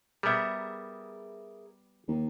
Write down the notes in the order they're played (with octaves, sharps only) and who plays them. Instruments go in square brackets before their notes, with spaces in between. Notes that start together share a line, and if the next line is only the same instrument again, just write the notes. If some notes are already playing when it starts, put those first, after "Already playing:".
[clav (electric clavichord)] G3 B3 [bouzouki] G#4 A#4 E5
[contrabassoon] D#2